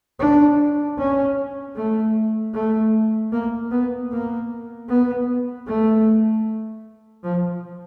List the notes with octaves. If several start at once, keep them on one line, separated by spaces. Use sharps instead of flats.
D4
C#4
A3
A3
A#3
B3
A#3
B3
A3
F3